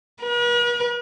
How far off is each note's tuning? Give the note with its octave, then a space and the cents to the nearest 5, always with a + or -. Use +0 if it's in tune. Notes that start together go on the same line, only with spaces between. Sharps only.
B4 -45